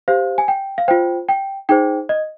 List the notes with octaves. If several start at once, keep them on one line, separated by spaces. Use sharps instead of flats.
G4 C5 F5
G#5
G5
F5
F4 C5 G5
G5
D#4 G#4 C5 G5
D#5